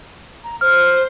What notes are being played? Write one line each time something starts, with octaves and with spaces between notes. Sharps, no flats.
A#5
C5 F6